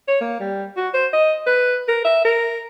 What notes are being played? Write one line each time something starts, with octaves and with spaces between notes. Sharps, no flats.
C#5
A#3
G3
F#4
C5
D#5
B4
A#4
E5
A#4